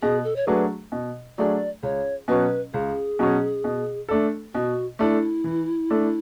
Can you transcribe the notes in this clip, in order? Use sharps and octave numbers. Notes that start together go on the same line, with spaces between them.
B2 G#4
A4
C#5
F#3 A3 D4 G#4 B4
B2
F#3 A3 D4 G#4 D5
C#2 C#5
B2 F#3 C#4 B4
C#2 G#4
B2 F#3 C#4
B2
A3 D4 A4
B2 F#4
A3 D4 E4 A4
E3
A3 D4 A4